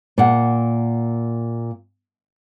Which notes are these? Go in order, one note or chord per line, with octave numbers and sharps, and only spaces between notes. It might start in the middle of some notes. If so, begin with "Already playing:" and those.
A#2 F#5